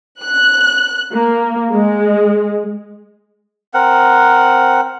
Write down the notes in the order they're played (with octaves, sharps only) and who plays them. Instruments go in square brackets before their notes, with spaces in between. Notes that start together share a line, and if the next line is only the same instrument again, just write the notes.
[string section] F#6
A#3
G#3
[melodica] C4 A#4 F#5